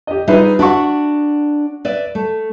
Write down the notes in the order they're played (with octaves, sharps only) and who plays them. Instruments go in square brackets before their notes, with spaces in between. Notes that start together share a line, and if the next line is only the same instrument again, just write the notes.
[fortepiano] G4 D#5
[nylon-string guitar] G3 D#4 G#4 [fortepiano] F4 B4 E5
[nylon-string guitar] D4 E5 F#5 [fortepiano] F#4 C#6
[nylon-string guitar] B4 D5 E5
A3